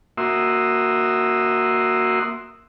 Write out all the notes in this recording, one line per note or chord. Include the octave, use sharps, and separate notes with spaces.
A#3 F#4 E5 C6 D#6 E6